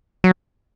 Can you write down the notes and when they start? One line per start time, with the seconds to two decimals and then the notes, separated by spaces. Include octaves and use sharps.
0.24 F#3